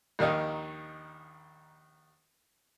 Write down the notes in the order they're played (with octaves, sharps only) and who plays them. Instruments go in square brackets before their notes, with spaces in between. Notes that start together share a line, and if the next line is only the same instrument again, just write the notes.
[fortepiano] A#1 D#2 D#3 D#4 F5